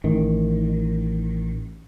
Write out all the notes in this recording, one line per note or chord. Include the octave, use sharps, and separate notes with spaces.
A1 D#3